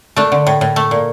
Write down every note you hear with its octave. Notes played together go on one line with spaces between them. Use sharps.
A3 D4
D3
A2
A2
A3
A#2